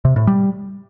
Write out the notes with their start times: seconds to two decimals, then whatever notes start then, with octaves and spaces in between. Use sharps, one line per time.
0.05 C3
0.16 A2
0.27 G3